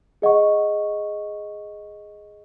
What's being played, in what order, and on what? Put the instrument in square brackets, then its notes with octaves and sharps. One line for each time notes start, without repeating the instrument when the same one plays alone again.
[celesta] G#4 D#5 F#5 C#6